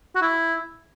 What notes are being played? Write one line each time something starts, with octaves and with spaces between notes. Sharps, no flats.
F#4
E4